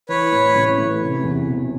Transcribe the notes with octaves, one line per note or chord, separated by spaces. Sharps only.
E3 B4 C#5
A2
A1
A3
C3
E2
E1